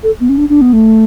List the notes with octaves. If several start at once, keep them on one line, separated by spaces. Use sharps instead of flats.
A4
B3
C#4
D4
D4
B3
A3